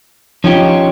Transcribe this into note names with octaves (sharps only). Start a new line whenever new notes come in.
F3 C#4 D#4 F4 G4 C#5